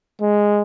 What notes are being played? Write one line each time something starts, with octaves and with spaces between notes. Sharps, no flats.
G#3